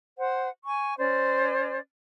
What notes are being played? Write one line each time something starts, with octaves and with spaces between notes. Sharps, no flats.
C5 F#5
G#5 C#6
C#4 C5 D5